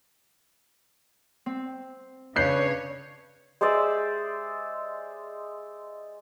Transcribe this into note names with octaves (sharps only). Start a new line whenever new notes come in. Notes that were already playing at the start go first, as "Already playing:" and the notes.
C4
C#3 D4 B4 C#5 F#6 G6 C7
G#3 C5 D5 E5